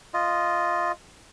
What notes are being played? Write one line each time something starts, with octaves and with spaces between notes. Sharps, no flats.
F4 D#5